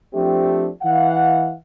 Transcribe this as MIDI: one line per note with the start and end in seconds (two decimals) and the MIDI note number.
0.14 0.68 53
0.14 0.68 57
0.14 0.68 60
0.14 0.68 62
0.14 0.68 67
0.82 1.53 52
0.82 1.53 77
0.82 1.53 78